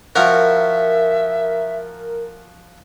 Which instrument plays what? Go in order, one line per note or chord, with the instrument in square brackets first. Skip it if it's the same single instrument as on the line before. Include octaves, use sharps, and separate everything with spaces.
[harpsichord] F3 C#4 F#4 [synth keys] A#4 [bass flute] E5